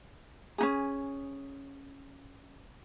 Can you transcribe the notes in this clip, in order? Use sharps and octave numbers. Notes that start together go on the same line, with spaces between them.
C#4 D#4 G#4